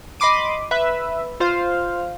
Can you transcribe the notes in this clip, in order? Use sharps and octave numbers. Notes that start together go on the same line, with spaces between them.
D#5 B5 C6 D6 D#7
B4 E5
F4 C5 F5